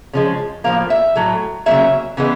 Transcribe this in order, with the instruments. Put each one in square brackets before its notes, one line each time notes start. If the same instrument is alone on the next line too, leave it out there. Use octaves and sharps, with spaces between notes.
[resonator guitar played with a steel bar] C#3 F3 G#3
A2 F3 A#3 F5
E5
A2 F#3 A3
C#3 F#3 A#3 E5
C#3 E3 G#3 B3